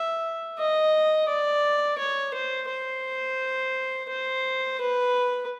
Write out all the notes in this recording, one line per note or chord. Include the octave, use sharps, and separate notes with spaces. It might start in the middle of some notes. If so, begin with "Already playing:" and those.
Already playing: E5
D#5
D5
C#5
C5
C5
C5
B4